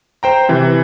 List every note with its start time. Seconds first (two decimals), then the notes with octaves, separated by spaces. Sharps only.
0.23 C5 G5 A#5
0.49 C3 E3